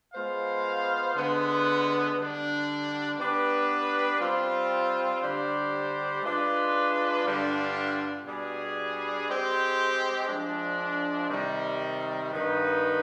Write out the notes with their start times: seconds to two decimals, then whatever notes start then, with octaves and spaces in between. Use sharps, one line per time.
0.14 G#3 B3 F4 C5 F5
1.15 D3 G#3 B3
2.16 D3 G3 D4
3.19 B3 D4 G4 B4
4.20 G3 C4 F4
5.21 D3 G3 D4 G4 C5
6.22 G#3 D4 F4 B4
7.24 G2 D3 G3 D4 F4
8.25 B2 G3 D4 G#4
9.27 G#3 C4 G4
10.28 F3 G#3 D4
11.30 C3 D#3 G3
12.31 G2 D#3 B3 D#4 B4